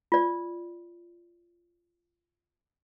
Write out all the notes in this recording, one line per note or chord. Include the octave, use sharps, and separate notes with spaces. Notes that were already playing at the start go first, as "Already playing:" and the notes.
F4 D5